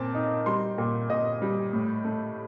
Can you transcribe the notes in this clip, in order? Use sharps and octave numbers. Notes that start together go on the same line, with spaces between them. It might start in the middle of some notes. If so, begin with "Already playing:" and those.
Already playing: A#2 C4 A5
D#4
G3 C6
A#2
A#2 D#5
G3
A2
A3